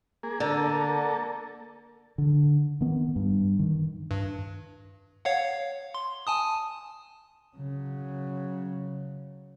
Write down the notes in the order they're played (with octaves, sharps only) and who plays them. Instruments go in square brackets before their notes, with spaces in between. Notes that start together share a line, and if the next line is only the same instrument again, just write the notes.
[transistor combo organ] A#3 G#4
[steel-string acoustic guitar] D3 [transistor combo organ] A#3 A4
[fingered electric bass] D3
D#3 B3
G2
D#3
[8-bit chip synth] G2
C#5 F5 F#5
C6
G#5 A5 D#6
[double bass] C#3 F#3